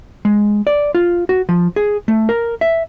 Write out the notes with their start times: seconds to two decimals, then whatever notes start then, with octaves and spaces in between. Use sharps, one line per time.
0.25 G#3
0.67 D5
0.95 F4
1.29 F#4
1.49 F3
1.76 G#4
2.08 A3
2.29 A#4
2.61 E5